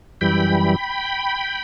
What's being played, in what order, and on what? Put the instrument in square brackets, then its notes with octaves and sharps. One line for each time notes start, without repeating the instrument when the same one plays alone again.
[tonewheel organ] F#2 E3 G3 G5 B5